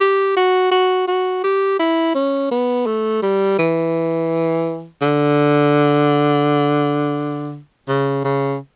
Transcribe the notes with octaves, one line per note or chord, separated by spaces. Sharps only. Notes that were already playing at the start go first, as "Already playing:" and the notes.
G4
F#4
F#4
F#4
G4
E4
C#4
B3
A3
G3
E3
D3
C#3
C#3